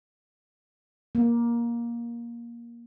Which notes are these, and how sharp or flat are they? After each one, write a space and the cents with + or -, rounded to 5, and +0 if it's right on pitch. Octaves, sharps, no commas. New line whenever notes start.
A#3 +15